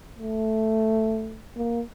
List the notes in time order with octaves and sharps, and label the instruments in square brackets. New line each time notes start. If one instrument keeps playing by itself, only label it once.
[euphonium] A3
A#3